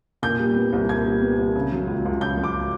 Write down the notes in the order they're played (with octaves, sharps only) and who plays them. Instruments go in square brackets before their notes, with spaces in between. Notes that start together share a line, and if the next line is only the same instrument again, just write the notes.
[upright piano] A#2 G6
G3
B3
C2
A#2 G#6
G3
B3
C2
C#3
F#3
C#2
C#2
C#3 G6
F#3
D6